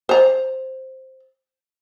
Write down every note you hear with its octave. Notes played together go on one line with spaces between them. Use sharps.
C5 A#5